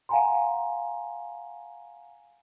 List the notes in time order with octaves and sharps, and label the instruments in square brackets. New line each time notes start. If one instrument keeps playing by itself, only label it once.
[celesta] F5 F#5 G#5 A#5 C6